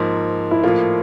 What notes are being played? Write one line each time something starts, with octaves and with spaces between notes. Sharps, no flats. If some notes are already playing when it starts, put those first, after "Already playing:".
Already playing: G#2 F3 A#3
E4
A2 F3 A#3 F4